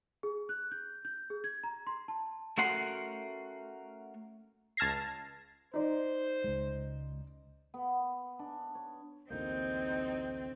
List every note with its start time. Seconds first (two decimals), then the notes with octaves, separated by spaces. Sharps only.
0.23 G#4
0.49 F#6
0.72 G6
1.05 G6
1.30 G#4
1.44 G#6
1.63 A#5
1.87 C6
2.08 A5
2.58 A3 C#4 F#4 A#4 F#5 C6
4.77 C#2 A5 F6 G#6 A#6 C7
5.74 D#4 C5 D5
6.44 C#2 G#3
7.74 B3
8.39 D4
8.75 C#5
9.30 A1 D2 A#3 C4 D#4 G6